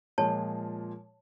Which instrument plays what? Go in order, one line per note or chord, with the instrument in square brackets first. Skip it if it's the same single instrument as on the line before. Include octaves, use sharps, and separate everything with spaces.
[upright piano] A#2 F3 G#3 [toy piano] C#5 A5